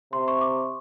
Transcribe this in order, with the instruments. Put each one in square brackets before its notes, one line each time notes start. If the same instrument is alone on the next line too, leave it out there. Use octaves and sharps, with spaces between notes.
[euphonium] C3 [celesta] C6
[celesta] C#6
D6